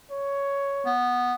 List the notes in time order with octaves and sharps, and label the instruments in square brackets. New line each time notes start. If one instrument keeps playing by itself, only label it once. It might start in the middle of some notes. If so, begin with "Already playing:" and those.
[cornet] C#5
[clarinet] B3